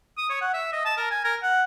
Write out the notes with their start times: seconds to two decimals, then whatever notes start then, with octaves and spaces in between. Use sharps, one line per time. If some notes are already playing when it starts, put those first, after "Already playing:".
0.18 D#6
0.30 C#5
0.41 F#5
0.54 E5
0.72 D#5
0.85 A5
0.97 A#4
1.11 G#5
1.24 A#4
1.43 F#5